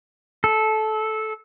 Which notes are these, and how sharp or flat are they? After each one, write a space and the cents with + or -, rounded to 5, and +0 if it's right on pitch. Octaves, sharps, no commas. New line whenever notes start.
A4 -15